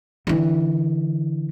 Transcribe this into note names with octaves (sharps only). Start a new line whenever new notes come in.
D3 E3